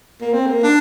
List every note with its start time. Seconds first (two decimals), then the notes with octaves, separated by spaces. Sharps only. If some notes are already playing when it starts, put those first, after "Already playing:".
0.21 A#3
0.33 C4
0.46 A#3
0.63 D4